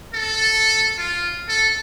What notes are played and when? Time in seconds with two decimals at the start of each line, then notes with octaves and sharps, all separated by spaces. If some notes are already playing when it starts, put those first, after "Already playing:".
0.14 A4
0.97 F4
1.49 A4